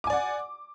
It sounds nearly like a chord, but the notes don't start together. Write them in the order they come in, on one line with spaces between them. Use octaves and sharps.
D6 G#5 D5 F#5